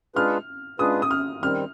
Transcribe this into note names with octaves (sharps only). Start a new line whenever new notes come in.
G#3 D4 F4 G#4 B4 F6
G#3 D4 F4 G#4 B4 D#6
D#6
F6
D#3 G3 C4 F6